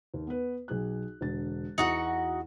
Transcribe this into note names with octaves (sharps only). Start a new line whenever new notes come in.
D#2
B3 B4
B1 G#4 F#6
E1 D3 A6
E2 D#4 E4 F#4 F#5